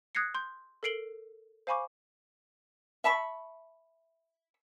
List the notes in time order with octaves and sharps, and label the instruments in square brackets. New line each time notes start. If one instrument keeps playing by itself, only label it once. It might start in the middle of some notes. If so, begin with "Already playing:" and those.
[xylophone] D#6 F#6 G#6 A#6 C7 C#7
C6 G6
A4 A#4 C7 D7 F#7 G7
C5 F5 G#5 B5 C#6 D6
[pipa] E5 A5 B5 C#6